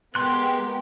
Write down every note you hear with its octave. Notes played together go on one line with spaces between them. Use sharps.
G#3 B3 G4 A#4 C6 F#6